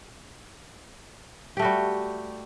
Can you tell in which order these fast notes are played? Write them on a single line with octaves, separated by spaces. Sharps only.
G4 A3 F#4 G3